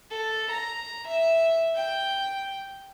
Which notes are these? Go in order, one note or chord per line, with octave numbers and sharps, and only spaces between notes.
A4
A#5
E5
G5